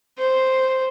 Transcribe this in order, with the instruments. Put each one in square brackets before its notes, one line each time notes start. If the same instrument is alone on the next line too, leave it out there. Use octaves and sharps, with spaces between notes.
[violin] C5